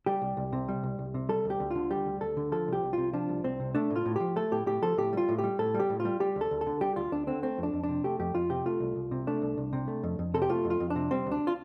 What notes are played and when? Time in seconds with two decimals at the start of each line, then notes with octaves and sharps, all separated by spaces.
0.06 G3 G4
0.22 C2
0.37 C2
0.53 C3
0.68 G3
0.83 C2
0.99 C2
1.14 C3
1.29 G3 A4
1.45 D2
1.50 G4
1.60 D2
1.71 D3 F4
1.91 G3 G4
2.06 D2
2.21 D2 A4
2.37 D3
2.52 F3 A4
2.68 C2 G4
2.83 C2
2.93 F4
2.98 C3
3.13 F3 D4
3.29 C2
3.44 C2 C4
3.60 C3
3.75 A3 D4
3.90 A2
3.96 F4
4.06 A2
4.16 F3 G4
4.36 A3 A4
4.52 A2 G4
4.66 A2 G4
4.82 F3 A4
4.98 A2 G4
5.13 G3 F4
5.29 A2
5.38 G4
5.44 G3
5.59 A2 A4
5.74 G3
5.79 G4
5.90 A2
6.00 F4
6.05 G3
6.20 G3 G4
6.36 D2
6.41 A4
6.51 D2
6.61 A4
6.67 D3
6.81 G3 G4
6.96 D2 F4
7.12 D2 D4
7.27 D3 C4
7.43 A3 C4
7.58 F2 D4
7.73 F2
7.83 D4
7.89 C3
8.04 A3 G4
8.19 F2 G4
8.35 F2 F4
8.50 C3 G4
8.66 A3 F4
8.80 C2
8.96 C2
9.11 C3
9.27 A3 D4
9.42 C2
9.58 C2
9.73 C3
9.88 A3
10.03 F2
10.19 F2
10.34 C3 A4
10.42 G4
10.49 A3 F4
10.65 F2
10.70 F4
10.80 F2
10.90 D4
10.96 C3
11.11 G3 C4
11.26 D2
11.32 D4
11.47 F4